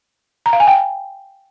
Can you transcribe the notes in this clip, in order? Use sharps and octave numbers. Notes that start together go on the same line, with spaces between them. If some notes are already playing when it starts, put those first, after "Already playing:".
A#5
F5
G#5
G5